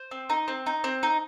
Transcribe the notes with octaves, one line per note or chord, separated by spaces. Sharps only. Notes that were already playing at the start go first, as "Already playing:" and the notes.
Already playing: C5
C4
D#4
C4
D#4
C4
D#4